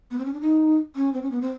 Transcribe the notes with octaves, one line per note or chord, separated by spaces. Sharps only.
B3
C4
C#4
D4
D#4
C#4
C4
C#4
B3
C4